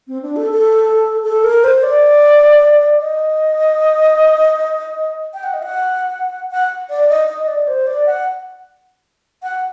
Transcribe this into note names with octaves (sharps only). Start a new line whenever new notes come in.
C4
D4
A4
A4
A4
A#4
C5
D5
D#5
G5
F#5
D#5
F#5
F#5
D5
D#5
D#5
D5
C5
D5
F#5
F#5